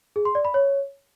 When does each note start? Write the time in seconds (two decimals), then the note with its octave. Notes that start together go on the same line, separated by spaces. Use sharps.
0.16 G#4
0.25 C6
0.35 D5
0.45 B5
0.54 C#5